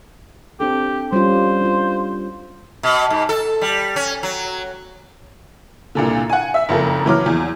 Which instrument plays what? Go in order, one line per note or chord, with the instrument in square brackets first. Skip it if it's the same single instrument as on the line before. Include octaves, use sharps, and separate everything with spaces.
[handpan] C4 D4 A4 [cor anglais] G4
[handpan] G3 C#4 F4 [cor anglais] C5
[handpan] D4 F4
[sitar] B2
G#2
A4
G3
C#4
F#3
[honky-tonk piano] C2 A#2 D3
F#5 G#5
E5 E6
F#1 F2 A4 A#4
E3 F#3 D6 F6
E2